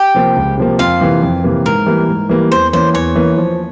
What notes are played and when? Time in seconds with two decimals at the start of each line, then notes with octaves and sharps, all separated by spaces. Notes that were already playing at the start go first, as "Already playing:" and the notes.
Already playing: G4 G5
0.14 C3 F3 A#3
0.36 C#2
0.57 C3 F3 A#3
0.79 F2 F4 F5
1.01 C3 E3 A#3
1.22 F2
1.44 C3 E3 A#3
1.65 G#2 A#4
1.87 E3 G3 A#3
2.08 G#2
2.29 E3 G3 A#3
2.51 E2 C5
2.73 E3 A#3 C#4 C5
2.94 E2 C#5
3.16 E3 A#3 C#4
3.37 F3